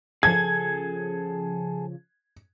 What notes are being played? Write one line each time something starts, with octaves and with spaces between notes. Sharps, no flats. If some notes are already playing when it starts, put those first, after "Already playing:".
C#3 F3 G#4 A4 G#6